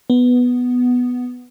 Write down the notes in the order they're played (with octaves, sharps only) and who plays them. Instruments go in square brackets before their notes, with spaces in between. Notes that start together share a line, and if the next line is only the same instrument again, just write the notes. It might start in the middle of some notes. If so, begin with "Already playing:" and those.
[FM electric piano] B3